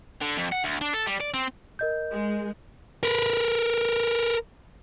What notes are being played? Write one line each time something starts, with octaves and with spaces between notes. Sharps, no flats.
D3
F2
F#5
D2
D4
A4
G3
D5
C4
A#4 D#5 G6
G#3
A#4 B4